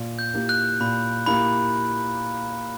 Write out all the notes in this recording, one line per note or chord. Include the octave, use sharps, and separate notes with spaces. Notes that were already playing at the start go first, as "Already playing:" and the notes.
Already playing: A#2
G6
A#3 E4 G4
F#6
A#2 B5
A#3 E4 G4 B5